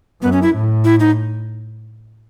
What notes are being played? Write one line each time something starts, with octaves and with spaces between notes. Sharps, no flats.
F#2 B3
C#4
E4
A2
E4
D#4